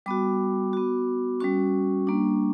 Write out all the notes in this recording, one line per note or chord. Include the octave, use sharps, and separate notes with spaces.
G3 B3 F#4 D6
B3 F#4
G3 C#4 F#4 C#6
G3 A#3 D4